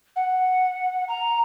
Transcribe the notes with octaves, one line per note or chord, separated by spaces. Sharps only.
F#5
A#5